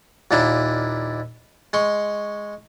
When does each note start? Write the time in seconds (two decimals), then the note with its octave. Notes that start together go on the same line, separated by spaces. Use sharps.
0.31 D#2 A#2 D4 E4
1.73 G#3 C6 C#6